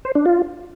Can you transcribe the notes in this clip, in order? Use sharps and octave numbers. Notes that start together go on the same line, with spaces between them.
C5
D4
F4